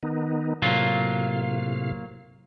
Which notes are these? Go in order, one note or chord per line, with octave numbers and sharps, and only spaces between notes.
D#3 B3 D#4
A2 C3 F#3 A#3 F4 F5